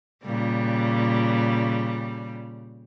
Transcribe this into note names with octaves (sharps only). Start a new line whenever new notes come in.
A#2 C#3 G3